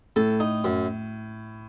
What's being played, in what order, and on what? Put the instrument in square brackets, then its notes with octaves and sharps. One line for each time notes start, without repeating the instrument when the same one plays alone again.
[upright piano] A2 [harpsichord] A4
[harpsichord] D#4
F#2